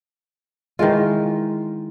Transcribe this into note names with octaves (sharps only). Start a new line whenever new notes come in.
D#3 E3 G#3 F4